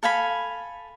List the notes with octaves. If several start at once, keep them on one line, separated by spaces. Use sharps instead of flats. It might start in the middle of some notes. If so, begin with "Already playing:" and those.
A4 F5 G#5 B5